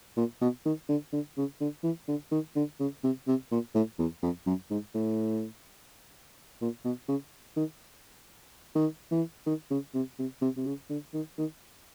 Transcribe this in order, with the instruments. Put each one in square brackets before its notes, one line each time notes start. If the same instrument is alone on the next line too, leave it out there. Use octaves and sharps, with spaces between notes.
[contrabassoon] A#2
B2
D#3
D3
D3
C#3
D3
E3
D3
D#3
D3
C#3
C3
C3
A#2
A2
E2
F2
F#2
G#2
A2
A#2
B2
C#3
D#3
D#3
E3
D#3
C#3
C3
C3
C3
C3
C#3
D3
D#3
D#3